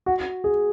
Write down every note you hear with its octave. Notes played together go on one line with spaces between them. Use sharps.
F#4
G#4